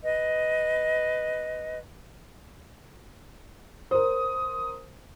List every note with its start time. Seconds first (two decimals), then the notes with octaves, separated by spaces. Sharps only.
0.03 B4 D#5
3.91 A#4 C5 D#6